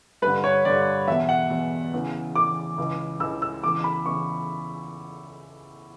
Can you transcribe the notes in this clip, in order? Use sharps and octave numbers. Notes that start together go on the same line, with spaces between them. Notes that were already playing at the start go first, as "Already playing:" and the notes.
G2 D3 B4
C#5
G2 D3 D5
E2 B2 E5
F#5
E2 B2
E2 C#3 E3
E2 C#3 E3 D6
C#2 C#3 E3
C#2 C#3 E3 E6
E6
E2 C#3 E3 D6
B5
E2 C#3 E3 C#6